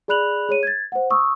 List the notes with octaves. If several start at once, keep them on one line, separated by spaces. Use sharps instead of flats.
G#4 D5 B5 F#6 F7 F#7
G#4 C#5 D#7
G#6 A6
C5 F#5
C#6 D#6 E6